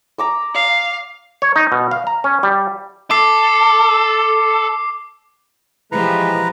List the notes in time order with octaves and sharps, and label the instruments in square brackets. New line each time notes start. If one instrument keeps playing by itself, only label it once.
[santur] A#5 D6 E6
[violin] F5
[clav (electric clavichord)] C#5
D#4
B2
F5
A#5
C#4
G3
[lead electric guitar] A4 [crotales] D6 C7
[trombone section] E3 G#3 [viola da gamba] F3 G4 [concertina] B4 A#5